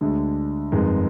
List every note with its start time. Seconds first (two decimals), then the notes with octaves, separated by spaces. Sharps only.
0.01 D2 D3 G#3
0.72 G1 F2 D#3 G#3